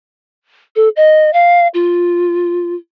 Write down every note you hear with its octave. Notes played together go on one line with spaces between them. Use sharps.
A4
D#5
F5
F4